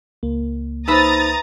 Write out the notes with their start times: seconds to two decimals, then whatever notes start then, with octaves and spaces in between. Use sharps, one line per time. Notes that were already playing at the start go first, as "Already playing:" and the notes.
0.23 C#2 A#3
0.88 D#4 B4 C5 E5 A#5 D#6 A6